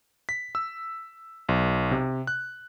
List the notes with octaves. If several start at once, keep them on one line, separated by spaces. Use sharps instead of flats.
B6
E6
B1
C3
F#6